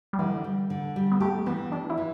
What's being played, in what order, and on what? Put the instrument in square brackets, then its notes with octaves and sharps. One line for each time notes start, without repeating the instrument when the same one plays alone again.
[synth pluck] G3
[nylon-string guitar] D3 [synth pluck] E3
[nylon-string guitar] G3
D3
G3
[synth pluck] B3
[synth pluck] A3 [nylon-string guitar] G4
[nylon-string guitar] E3 [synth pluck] B3
[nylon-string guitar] E3 [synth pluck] D4
[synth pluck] E4
[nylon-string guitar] E3